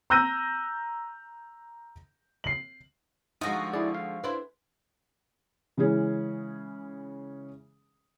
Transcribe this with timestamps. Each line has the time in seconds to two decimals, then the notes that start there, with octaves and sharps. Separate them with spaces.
0.10 A#5 E6 F#6 G6 A#6 D#7
2.44 C7 F#7
3.41 D3 F3 G#3 D#4 F#4 D#6 A#6
3.74 E4 G#4 D5
3.95 F5
4.24 D4 E4 B4 C5
5.77 C#3 E3 G#3 C#4 G#4